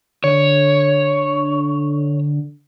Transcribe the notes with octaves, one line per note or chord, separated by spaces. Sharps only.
D3 C#5